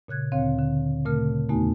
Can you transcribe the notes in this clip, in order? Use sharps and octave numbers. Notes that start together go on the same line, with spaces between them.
A#2 C#3 F#6 G#6
D2 A#2 D3 C4 C#5 F5
D3
A#2 C#3 A3 A#4 F6
E2 A3 B3 D#4 F#4 G#5